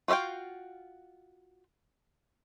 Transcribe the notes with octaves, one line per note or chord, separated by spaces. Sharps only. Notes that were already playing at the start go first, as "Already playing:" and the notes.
F4 F#4 E5 F5 G5